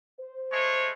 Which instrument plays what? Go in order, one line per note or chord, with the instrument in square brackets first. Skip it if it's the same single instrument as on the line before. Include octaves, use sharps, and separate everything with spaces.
[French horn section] C5
[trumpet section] G#3 A3 C#5